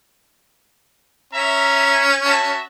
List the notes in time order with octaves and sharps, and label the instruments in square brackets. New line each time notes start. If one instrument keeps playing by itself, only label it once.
[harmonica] C#4 [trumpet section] E5 A#5
[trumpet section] F#4 E5 A5